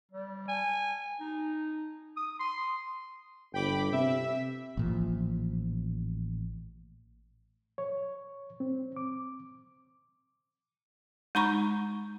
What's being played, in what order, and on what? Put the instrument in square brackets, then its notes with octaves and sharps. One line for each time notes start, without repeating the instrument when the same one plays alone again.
[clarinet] G3
G#5
D#4
D#6
C6
[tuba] G1 [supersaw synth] G5 B5 D6
[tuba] C3 [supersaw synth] E5
[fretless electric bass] A1 A#2 F3
[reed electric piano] C#5
C4
D6
[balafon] G#3 D#4 A#5 B5 C#6